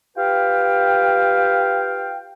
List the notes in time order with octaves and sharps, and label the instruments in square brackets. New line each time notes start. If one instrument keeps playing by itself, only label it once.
[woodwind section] F4 G4 B4 F5 G5